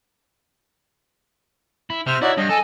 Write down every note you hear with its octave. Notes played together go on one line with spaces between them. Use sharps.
E4
C3 C5 E5 F6
D#4 E4 F#4 C#5 D5
G2 D#5
A4 G#5